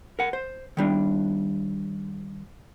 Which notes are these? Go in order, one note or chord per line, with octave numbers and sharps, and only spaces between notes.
A#4 F#5
C5
D#3 G3 D4